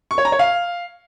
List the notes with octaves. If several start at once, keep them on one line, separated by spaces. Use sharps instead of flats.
C#6
C#5
A#5
C#5
F5